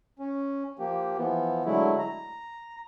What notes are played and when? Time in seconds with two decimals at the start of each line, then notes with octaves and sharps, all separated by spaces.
0.19 C#4
0.79 F3 A#3 G4
1.17 E3 F3 B3
1.65 D3 F#3 G#3 A3 E4
1.99 A#5